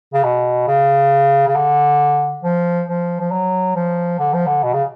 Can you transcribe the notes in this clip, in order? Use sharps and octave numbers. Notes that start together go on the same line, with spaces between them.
C#3
B2
C#3
C#3
D3
F3
F3
F3
F#3
F3
D3
F3
D3
B2
C#3